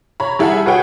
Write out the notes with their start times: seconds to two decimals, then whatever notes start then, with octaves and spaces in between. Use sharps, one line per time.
0.20 C#5 A#5 B5
0.39 G3 E4 G#4 A4 F#5
0.66 F#4 G#4 B4 C#5 F#5 G5